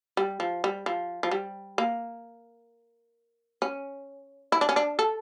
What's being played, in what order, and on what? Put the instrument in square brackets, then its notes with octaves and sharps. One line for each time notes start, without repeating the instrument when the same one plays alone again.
[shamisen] G3
F3
G3
F3
F3
G3
A#3
C#4
E4
D4
C#4
D4
A4